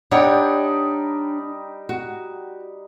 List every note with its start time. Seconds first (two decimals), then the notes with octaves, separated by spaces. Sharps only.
0.11 G3 D4 D#4 C#5 F#5 G5
1.89 F#4